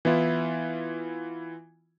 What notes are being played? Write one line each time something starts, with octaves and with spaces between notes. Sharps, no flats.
E3 B3 E4 F4